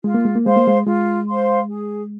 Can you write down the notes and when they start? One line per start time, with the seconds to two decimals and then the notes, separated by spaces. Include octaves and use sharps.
0.04 G#3 F4
0.14 A#3
0.25 G#3
0.35 A#3
0.44 G#3 C5 F5 C6
0.57 A#3
0.67 G#3
0.85 G#3 F4
1.27 C5 F5 C6
1.69 G#4